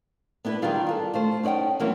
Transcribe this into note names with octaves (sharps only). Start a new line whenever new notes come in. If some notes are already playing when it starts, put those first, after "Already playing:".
B3 D4 E4 A4 B4
D#3 G3 D4 F4 G#4
D4 F4 A4
A3 F4 C5
C#4 D#4 D5 F#5 G5
E3 F#3 A#3 C4 C#4 E4